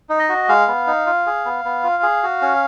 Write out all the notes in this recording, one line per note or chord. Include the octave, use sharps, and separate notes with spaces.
D#4
D#5
F#4
G#3 F5
B3
D#4
F4
G#4
B3
B3
F4
G#4
F#4
C#4